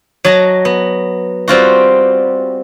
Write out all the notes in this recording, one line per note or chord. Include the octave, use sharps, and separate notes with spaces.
F#3 D#5 A5 A#5
B3
G3 C4 F4 F#4